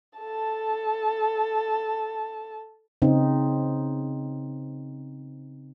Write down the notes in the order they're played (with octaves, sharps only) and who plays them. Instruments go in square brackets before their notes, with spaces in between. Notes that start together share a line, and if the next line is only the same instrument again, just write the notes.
[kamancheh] A4 A5
[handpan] C#3 C4 D#4